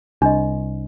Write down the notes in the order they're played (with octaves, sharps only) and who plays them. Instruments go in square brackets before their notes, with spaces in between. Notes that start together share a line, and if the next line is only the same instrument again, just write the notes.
[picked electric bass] C2 [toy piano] D4 D#5